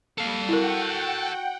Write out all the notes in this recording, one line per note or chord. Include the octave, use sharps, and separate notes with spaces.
G3 A#3 A4 F5
E4 F#4 A#4 F#5 G5